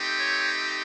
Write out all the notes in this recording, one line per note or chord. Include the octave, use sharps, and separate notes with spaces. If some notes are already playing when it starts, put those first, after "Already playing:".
Already playing: A3 C4 D#4 G4
C#5